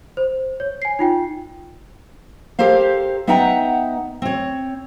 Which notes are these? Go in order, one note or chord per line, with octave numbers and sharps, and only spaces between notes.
C5
C#5
G#5 C7
D#4 F4 G5
G4 A4 A#4 C5 F5
B3 D#4 E5 F#5 G5 A#5
C4 C#5